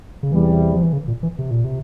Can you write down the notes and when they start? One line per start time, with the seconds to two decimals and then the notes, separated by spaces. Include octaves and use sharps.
0.23 C#3
0.32 E2 C3 E3 G3
0.73 F3
0.83 E3
0.93 C#3
1.08 A#2
1.23 E3
1.39 C3
1.51 A#2
1.64 C3